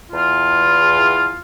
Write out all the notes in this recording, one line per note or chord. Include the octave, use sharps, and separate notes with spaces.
E2 F4